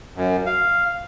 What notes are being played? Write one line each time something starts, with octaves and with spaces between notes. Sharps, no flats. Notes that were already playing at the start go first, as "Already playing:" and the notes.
F#2
F5